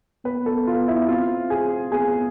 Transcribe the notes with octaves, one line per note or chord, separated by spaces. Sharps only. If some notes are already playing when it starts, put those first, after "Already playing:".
B3 B4
A4
F4
E4
C4 F4
G#4
B3 G#4